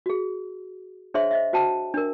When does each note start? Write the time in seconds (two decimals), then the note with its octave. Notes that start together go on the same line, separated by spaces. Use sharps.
0.06 F#4 G#4
1.14 D4 G#4 C5 C#5 E5 C6
1.31 C5 D#5 E5
1.53 F#4 C5 G5 A5
1.94 D4 A#4